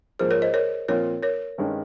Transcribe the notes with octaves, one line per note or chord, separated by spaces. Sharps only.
G#2 F3 A#3 G#4 C5
A#4 C#5
C5 D#5
A#4 C#5
A#2 F3 C4 F4 A#4 C#5
A#4 C#5
G2 D#3 G#3 C#4